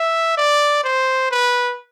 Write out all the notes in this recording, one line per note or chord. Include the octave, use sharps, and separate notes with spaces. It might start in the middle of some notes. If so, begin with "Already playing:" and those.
Already playing: E5
D5
C5
B4